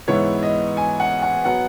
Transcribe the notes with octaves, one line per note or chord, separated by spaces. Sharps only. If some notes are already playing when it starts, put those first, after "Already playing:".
G#2 E3 B3 E4 C#5
D#5
G#5
F#5
F#5
F#3 B3 F#5